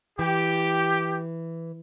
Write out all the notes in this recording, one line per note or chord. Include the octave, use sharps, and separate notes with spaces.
E3 G4